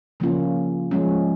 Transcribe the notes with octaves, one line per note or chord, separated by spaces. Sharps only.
C#3 F3 A#3 C#4 F4
F3 G#3 C#4